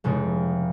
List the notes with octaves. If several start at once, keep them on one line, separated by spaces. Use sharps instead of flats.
F1 F2 C#3 G#3